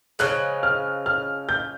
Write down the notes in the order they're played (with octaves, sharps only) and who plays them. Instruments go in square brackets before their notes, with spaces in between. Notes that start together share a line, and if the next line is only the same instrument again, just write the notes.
[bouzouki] C#3 F3 G#3 [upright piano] F#6
[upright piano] F6
F6
G6